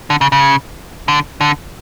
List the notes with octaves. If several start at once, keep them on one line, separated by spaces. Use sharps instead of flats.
D3
C#3
C#3
D3
D3